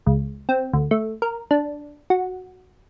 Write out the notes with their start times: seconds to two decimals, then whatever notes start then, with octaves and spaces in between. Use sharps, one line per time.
0.06 C#2
0.49 C4
0.73 D2
0.91 A3
1.22 A#4
1.51 D4
2.10 F#4